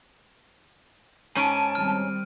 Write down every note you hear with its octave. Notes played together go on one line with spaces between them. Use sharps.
G#2 C#4 A5 D7 D#7
D#3 G3 C4 F6